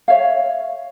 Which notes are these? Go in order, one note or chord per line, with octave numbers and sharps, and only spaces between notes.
C#5 E5 F5